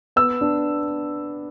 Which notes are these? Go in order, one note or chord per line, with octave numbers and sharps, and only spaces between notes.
B3 E6
D4